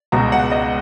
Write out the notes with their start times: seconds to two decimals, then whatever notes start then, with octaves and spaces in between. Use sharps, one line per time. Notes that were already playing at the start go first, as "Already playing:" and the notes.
0.12 C#2 B2 A#5
0.32 F#5
0.52 D#5